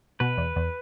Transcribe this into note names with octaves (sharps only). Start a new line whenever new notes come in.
B2 B4
E2
E2